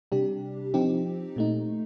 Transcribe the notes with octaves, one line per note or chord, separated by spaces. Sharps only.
C3 G3 D4 G4
F3 C4 D#4 G4
A#2 A3 D#4